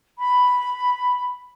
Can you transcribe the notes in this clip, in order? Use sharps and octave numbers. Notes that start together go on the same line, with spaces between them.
B5